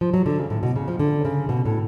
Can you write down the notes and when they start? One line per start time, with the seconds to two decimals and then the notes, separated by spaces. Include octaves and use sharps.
0.01 F3
0.14 F#3
0.26 D3
0.38 C#3
0.50 A2
0.63 B2
0.76 C#3
0.88 F3
0.99 D3
1.25 C#3
1.49 B2
1.65 A2